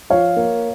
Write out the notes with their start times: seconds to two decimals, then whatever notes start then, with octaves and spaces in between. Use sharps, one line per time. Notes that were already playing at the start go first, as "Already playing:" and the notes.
0.10 F3 C#5 F5
0.36 A#3